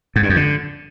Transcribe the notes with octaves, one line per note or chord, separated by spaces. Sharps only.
G#2
G2
F2
D3